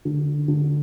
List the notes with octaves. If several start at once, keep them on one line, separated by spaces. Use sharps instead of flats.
D3
D3